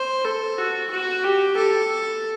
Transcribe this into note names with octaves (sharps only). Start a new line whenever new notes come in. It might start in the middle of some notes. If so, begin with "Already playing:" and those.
Already playing: C5
A4
F#4
F#4
G4
A4